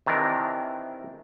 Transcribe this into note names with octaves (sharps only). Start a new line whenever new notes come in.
C3 D#3 E3 D4 A#4